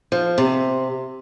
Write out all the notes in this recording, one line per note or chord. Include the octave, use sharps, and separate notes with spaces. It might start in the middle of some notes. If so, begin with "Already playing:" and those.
F3
C3